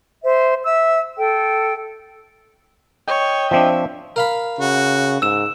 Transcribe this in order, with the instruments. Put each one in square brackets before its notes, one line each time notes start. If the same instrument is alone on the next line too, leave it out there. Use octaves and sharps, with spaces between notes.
[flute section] C5 E5
E5 E6
A4 G5
[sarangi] C#5 [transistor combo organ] D#5 G5
[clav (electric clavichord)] F3 C4 D4 [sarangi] E5
[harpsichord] A#4 F5 B5
[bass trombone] C#3 [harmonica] F#4
[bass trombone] G#2 [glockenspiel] E6 E7